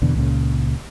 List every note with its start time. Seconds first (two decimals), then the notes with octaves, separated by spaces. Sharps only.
0.02 E2 B2 D3
0.16 C#2 A#2 C#3